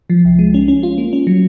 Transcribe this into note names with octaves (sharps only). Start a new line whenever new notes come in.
F3
C2
G#3
C#4
C#4
F4
A#3
C#4
F#3